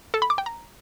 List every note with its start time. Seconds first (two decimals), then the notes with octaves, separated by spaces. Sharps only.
0.14 A4
0.22 B5
0.30 D6
0.38 G5
0.46 A#5